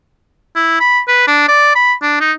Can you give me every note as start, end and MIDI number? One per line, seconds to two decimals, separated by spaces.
0.56 0.77 64
0.80 1.01 83
1.08 1.27 71
1.28 1.44 62
1.48 1.71 74
1.75 1.93 83
2.02 2.18 62
2.20 2.33 63